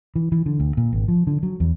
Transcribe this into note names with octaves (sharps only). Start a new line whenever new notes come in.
E3
E3
D3
D2
A#2
G#1
F3
D3
F#3
E2